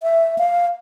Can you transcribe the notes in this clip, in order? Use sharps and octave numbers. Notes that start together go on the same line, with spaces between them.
E5
F5